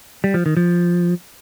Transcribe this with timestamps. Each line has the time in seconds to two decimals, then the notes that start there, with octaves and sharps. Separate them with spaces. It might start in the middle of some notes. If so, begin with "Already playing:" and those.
0.24 G3
0.34 F3
0.46 D#3
0.57 F3